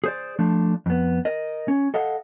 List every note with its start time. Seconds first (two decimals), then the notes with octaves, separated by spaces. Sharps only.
0.04 G#4 C5 D5
0.39 F3 A3 D4
0.86 F2 B3
1.25 A#4 D#5
1.68 C#4
1.94 A4 D#5 F5 F#5